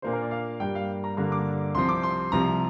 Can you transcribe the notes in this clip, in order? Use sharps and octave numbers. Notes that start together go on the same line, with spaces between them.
A#2 A#3 D4 C5
A#4
D5
F5
G2 G3 A#3 G5
F5
A#5
G2 D3 A#3 D4 A#5
D6
C2 C3 F3 C4 C6
D6
C6
C2 C3 F3 A#5